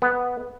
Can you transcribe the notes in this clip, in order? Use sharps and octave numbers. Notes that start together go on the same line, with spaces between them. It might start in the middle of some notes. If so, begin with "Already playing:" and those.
B3